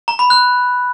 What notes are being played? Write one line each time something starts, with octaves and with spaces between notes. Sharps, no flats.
A#5
B5
F#6